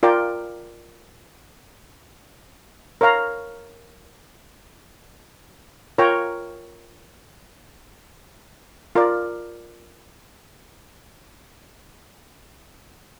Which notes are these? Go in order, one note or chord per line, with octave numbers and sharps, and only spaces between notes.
F4 A#4 D5 G5
A#4 C#5 F5 A#5
F4 A#4 C#5 G5 A#5
F4 A#4 D5